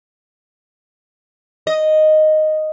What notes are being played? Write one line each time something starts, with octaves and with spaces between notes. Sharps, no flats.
D#5